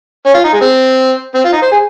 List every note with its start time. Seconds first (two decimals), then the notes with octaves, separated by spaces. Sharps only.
0.26 C#4
0.34 F4
0.44 D#4
0.53 G#3
0.61 C4
1.34 C4
1.44 F4
1.53 D#4
1.62 C5
1.72 G#4